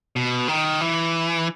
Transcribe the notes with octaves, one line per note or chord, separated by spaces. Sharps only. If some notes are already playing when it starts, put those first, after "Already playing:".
B2
D#3
E3